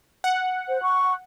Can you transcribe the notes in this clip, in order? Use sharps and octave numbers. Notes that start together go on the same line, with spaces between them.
F#5
C5
C#6